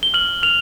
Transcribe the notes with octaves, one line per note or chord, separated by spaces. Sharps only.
G7
F6 F#7
F6 F7